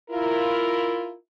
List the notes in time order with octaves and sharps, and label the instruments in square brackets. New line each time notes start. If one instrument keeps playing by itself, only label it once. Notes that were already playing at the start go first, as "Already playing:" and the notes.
[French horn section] E4 F4 A#4